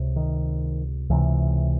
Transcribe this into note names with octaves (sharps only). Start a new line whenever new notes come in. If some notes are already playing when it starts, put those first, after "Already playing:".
Already playing: C#2 C3
D#3
C#2 C3 E3